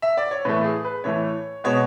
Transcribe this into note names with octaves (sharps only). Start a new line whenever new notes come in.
E5
D5
C#5
A2 E3 A3 B4
G#4
B4
A2 E3 A3 C#5
B2 G#3 B3 C#5